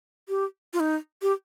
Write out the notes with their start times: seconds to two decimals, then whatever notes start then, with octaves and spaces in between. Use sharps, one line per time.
0.29 G4
0.74 F4
0.80 D#4
1.22 G4